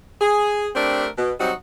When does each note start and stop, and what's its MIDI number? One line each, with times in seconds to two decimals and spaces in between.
0.21 0.68 68
0.75 1.07 57
0.75 1.07 60
0.75 1.07 62
0.75 1.07 67
0.75 1.07 70
1.18 1.32 47
1.39 1.52 54
1.39 1.52 55
1.39 1.52 60
1.39 1.52 63
1.39 1.52 66